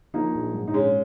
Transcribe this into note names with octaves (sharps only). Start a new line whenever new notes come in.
F3 A#3 D#4
A#1
G#2
D#4
A#1 G#3 C#4